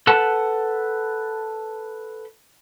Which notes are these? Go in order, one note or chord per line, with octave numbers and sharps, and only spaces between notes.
A4 B4 F#5 A5